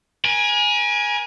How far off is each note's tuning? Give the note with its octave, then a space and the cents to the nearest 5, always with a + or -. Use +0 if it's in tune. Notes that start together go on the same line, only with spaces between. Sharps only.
A#4 +45 G#5 +0